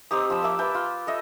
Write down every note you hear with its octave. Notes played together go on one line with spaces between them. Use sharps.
C4 D#4 G4 D#6
F3 B5 E6
A#3 E5 D6
B4 E5 G5 A5
F4
A4 D#5 E5